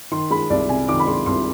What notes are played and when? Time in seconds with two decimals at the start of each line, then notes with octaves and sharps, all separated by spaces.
0.11 D#3 C6
0.30 G#3 B5
0.50 C2 D5
0.69 C3 G#5
0.88 D#3 D6
0.99 B5
1.07 G#3 C6
1.26 C2 C6